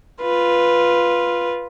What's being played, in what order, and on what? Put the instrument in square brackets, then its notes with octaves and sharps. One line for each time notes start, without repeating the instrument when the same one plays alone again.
[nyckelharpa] F4 B4